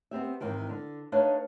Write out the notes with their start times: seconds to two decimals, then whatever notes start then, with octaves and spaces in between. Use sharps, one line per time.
0.11 B3 C4 G4 E5
0.40 G#2 C3 D#3 E3
0.69 D3
1.12 A3 D4 D#4 B4 C#5 F5